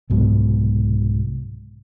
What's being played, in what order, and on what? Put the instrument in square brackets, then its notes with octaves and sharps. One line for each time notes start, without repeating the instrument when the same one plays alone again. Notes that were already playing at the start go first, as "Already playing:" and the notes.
[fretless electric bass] C2 G#2 B2 F#3